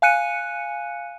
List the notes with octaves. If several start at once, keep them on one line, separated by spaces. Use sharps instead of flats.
F5 G#5 F#6 C#7 D#7